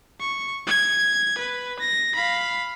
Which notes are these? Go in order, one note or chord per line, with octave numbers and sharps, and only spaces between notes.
C#6
G#6
B4
A#6
F5 B5